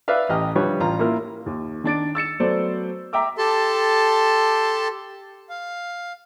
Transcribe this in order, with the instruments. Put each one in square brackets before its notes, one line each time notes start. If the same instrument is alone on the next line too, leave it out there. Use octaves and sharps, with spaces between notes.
[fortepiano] B4 D5 E5 F5
A1 G4 D#5 F6
D3 F3 G3 B4 C#5
A1 F4 A#5
A#3 E4 F4 A#4
[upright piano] D#2
D#3 D4 A6 D7
E6 A6 C#7 E7
F#3 A3 B3 C5 D5
E5 G5 A#5 D6 E6
[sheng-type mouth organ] G4 A4 A5 C6
F5